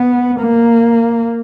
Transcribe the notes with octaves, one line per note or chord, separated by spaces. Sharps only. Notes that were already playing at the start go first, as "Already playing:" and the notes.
Already playing: B3
A#3